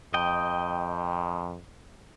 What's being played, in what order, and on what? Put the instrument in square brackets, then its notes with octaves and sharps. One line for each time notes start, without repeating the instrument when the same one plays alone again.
[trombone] F2 [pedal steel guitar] D#5 G5